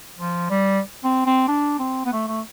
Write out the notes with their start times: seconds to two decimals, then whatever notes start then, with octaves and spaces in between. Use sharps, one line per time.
0.18 F3
0.50 G3
1.04 C4
1.26 C4
1.48 D4
1.79 C4
2.06 B3
2.13 A3
2.28 A3